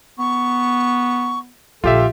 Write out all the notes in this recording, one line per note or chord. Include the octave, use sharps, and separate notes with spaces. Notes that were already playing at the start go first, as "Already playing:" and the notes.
B3 C#6
A#1 D3 F4 G4 A4 E5